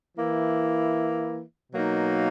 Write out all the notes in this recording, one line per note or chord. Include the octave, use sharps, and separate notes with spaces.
E3 A#3 E4
B2 F#3 A#3 D#4